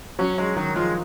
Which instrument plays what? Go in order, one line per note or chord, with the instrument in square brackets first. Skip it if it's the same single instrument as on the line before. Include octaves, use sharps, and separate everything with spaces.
[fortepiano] F#3 F#4 [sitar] C#4
[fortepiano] F#3 F#4 [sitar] G#3
[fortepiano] D#3 D#4 [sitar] F#3
[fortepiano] F3 F4 [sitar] G#3